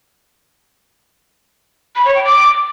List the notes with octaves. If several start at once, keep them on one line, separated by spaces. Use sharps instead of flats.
B5
C#5
G5
D6